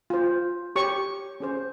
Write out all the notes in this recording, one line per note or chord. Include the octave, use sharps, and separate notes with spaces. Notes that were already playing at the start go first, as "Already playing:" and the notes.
F4 C5
G4 C#5 C#6
C#4 G#4 C5